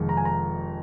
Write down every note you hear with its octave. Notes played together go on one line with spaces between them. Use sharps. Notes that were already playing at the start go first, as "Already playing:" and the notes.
Already playing: F1 F2 D#3 G#3
A#5
G#5
A#5